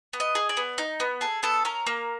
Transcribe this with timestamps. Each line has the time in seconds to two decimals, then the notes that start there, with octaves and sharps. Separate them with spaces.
0.13 B3
0.20 D#5
0.35 G#4
0.49 D5
0.57 B3
0.78 D#4
1.00 B3
1.21 G#4 A4
1.43 B3 A4
1.65 C#4 A#4
1.87 A#3